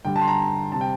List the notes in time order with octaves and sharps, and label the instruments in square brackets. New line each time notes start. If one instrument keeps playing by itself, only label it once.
[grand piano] G2 D3 G3 G5
A5
C6
A#5
C3 G3 C4 A5
G5